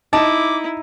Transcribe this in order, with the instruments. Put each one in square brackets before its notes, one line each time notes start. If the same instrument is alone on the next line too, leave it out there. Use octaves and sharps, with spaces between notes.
[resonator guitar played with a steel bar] D#4 [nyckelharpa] E4 [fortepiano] A5 [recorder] D6